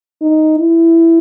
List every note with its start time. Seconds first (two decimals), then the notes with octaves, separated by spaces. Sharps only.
0.22 D#4
0.59 E4